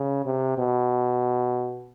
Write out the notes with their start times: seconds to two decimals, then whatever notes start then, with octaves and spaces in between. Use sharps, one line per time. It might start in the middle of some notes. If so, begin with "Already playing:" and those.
Already playing: C#3
0.25 C3
0.58 B2